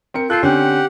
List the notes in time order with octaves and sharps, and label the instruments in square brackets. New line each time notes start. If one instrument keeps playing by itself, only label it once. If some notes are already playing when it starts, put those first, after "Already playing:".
[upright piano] C4 A#4 C#7
[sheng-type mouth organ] F4 A4 [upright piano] F#6 G6 C7
[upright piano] D3 C4 C#4 [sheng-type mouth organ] G4 F#5